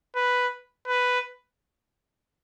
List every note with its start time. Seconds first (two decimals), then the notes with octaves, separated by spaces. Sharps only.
0.16 B4
0.88 B4